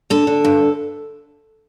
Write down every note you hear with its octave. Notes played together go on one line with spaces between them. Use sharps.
D3 A4
D3
G2